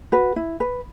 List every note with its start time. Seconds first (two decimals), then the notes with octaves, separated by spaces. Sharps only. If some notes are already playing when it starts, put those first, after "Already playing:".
0.12 F#4 B4
0.36 E4
0.60 B4